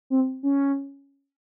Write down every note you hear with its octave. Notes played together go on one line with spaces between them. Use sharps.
C4
C#4